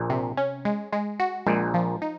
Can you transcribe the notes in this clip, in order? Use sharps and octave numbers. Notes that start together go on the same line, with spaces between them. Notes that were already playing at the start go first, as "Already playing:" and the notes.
Already playing: A#1 A#2
C3
C#4
G#3
G#3
F#4
A#1 A#2 G#3
F3
D#4